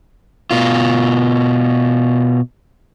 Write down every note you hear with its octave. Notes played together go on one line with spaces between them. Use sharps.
B2 F4